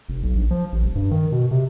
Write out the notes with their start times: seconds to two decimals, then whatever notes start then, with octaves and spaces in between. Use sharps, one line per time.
0.09 F1
0.23 B1
0.35 A#1
0.51 F3
0.72 A1
0.84 D#1
0.95 G2
1.11 D#3
1.32 B2
1.51 C3